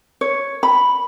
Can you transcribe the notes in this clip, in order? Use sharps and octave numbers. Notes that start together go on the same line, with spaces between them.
C#5
B5